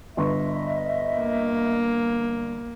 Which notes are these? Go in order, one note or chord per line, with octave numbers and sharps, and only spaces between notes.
G1 D#5 E5 C6 C#6
A#3